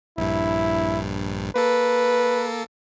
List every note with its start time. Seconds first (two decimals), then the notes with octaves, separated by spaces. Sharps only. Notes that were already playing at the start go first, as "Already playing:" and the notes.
0.18 A#1 G2 E4
1.55 A#3 A4 B4